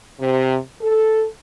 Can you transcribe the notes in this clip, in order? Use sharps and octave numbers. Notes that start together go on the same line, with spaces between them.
C3
A4